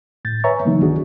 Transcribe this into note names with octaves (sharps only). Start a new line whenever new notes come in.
A2 G6 A6
B4 C#5 E5 G#5 A#5 C#6
C#3 E3 F#3 A#3 B3 D#4
C2 D#3 D4 F#4 G#4